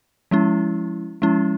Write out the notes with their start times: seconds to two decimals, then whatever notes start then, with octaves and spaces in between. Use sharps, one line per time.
0.31 F3 G#3 C#4 E4
1.22 F3 G#3 C#4 E4